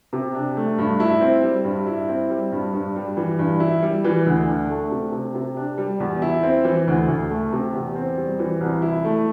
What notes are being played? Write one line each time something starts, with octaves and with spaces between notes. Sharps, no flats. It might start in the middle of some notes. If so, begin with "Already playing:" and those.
C3
D4
A3
G2
E4
C4
G3
G2
E4
C4
G3
G2
G2
G3
E3
G2
E4
G3
E3
D2
D4
A3
C3
C3
C3
D4
G3
E2
E4
C4
E3
D2
D2
A3
C3
E2
C4
G3
E3
C2
E4
A3